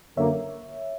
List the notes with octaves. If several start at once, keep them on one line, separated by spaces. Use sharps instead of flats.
F#2 D3 A#3 C#5 E5